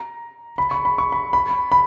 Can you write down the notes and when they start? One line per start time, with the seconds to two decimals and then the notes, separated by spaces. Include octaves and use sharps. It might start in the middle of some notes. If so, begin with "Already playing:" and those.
Already playing: A#5
0.58 B5
0.71 C#6
0.85 B5
0.98 C#6
1.12 B5
1.33 B5
1.72 B5